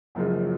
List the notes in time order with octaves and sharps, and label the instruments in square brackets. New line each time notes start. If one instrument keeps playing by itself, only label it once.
[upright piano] F#1 F#2 C#3 F3 G#3